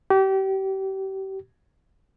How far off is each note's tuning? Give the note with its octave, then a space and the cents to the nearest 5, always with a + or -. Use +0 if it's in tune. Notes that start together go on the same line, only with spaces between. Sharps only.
G4 -30